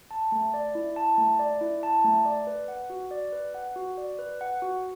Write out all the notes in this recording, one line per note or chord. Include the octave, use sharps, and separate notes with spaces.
A5
A3
D5
E4
A5
A3
D5
E4
A5
A3
D5
B4
F#5
F#4
D5
B4
F#5
F#4
D5
B4
F#5
F#4